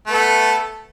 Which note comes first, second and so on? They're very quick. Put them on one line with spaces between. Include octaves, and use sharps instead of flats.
A3 B3 A4